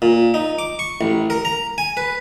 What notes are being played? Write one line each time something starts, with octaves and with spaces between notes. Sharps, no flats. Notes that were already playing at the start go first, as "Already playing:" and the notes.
A#2
D#4
D6
C#6
A1
A#4
A#5
G#5
B4